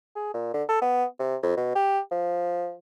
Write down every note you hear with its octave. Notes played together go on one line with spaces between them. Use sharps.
G#4
A#2
D3
A4
B3
C3
F2
B2
G4
F3